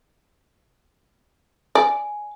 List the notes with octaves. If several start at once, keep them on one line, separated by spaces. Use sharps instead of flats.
D5 G#5